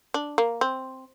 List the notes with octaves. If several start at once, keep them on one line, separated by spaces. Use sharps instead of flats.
D4
A#3
C4